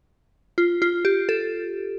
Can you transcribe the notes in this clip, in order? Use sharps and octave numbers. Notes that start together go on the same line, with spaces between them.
F4
F4
G4
A4